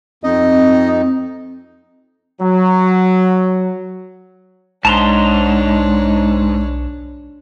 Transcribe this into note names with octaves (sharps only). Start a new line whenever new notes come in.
F2 C4 D#4 D#5
F#3
B1 G#2 D4 C#5 A5 A#5 C6